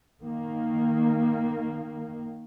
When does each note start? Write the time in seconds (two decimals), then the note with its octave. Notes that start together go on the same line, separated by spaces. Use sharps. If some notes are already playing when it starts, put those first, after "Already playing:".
0.20 D#3 A#3